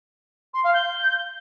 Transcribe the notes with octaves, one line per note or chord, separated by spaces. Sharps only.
C6
F5
G6